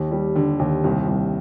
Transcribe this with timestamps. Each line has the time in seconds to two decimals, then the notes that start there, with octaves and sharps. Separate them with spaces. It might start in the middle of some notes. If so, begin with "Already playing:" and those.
Already playing: D#2
0.11 G3
0.36 D3
0.59 D#2
0.84 C2
1.07 C2